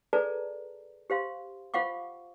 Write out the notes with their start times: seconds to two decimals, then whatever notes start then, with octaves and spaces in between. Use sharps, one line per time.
0.13 G#4 A4 B4 D5 A5 A#5
1.10 G4 C5 F5 C6
1.74 F4 C5 F5 F#5 C#6 D6